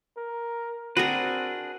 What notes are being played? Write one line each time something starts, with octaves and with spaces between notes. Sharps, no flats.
A#4
C4 D4 F#4 G#4 A#4 B4